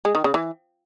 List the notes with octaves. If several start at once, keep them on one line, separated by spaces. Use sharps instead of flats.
G#3
D#3
C#3
E3